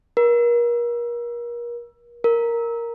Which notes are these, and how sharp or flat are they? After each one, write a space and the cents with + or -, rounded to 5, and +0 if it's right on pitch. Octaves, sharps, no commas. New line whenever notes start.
A#4 +35
A#4 +0